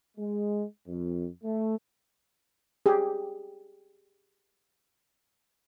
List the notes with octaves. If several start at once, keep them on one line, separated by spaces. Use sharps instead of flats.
G#3
F2
A3
G4 G#4